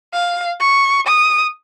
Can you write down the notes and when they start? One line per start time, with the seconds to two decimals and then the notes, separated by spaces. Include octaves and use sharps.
0.13 F5
0.60 C#6
1.07 D#6